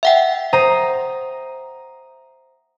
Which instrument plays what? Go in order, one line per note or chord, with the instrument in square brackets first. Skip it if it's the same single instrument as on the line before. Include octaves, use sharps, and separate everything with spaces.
[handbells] E5 F#5 G5
[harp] C5 A#5 D#6